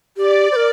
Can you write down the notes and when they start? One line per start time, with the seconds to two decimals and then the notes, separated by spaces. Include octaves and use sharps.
0.17 G4 D5
0.52 C5
0.56 A#4